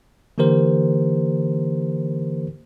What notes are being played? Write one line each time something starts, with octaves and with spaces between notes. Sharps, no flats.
D3 E3 A#3 G4 A#4 C5